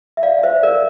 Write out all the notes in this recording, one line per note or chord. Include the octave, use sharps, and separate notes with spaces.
E5
D5 F5
F5
C5 E5
A#4 D5